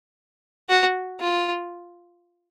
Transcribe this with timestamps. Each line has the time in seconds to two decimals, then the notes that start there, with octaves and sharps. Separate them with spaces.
0.69 F#4
1.20 F4